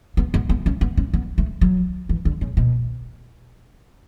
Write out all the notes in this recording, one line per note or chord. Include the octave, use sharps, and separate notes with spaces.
B3
B3
B3
C#4
B3
C#4
B3
A3
F#3
E3
D3
C#3
B2